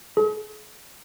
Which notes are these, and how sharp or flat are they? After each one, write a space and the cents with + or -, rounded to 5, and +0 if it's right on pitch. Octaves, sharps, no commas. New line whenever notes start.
G#4 +45